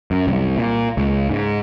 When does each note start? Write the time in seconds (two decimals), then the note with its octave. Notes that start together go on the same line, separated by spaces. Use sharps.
0.11 F#2
0.27 C2
0.57 A#2
0.97 C#2
1.29 G#2